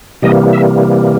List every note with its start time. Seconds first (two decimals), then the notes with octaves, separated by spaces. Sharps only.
0.22 C3 E3 G3 A#3 D#5
0.53 E5